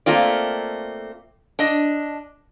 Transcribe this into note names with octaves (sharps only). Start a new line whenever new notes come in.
A3 A#3 C4 F4 D5
D4 D#5